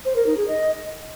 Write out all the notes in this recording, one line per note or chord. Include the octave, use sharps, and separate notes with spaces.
C5
A#4
D#4
G#4
D#5